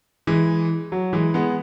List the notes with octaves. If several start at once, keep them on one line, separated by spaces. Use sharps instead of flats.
E3 G#3
F#3
E3 G#3
G#3 B3